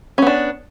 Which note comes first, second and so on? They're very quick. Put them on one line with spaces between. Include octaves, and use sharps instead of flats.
C#4 B3 D4